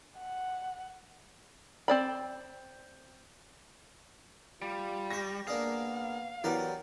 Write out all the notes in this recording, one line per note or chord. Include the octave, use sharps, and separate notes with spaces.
F#5
C4 D5 B5
G3 F4
G4 C#6 A#6
A#3 B3 D4 G#4 F5
E3 F#3 B3 G4 A#4 D5